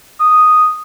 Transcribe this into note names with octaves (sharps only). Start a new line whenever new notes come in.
D#6